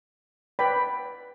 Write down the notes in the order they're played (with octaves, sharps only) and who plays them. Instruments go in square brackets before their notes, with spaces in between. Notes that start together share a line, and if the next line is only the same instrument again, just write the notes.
[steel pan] B4 D5 G5 B5